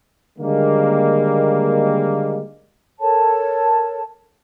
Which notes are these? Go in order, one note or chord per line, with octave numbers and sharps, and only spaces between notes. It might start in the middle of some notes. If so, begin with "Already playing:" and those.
D3 D#3 G3 G#3 A#3
A4 A#4 C#5 A5